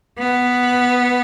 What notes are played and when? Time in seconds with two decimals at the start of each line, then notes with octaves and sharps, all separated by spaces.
0.18 B3